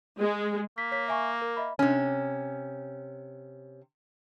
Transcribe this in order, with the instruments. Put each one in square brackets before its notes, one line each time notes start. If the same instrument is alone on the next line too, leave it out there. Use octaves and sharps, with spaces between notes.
[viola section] G#3
[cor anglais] A#3 [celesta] B6
[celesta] C#5 B6
E5 G#5 C#6
A#4
D#5 E5 B5
[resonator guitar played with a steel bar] C3 C#4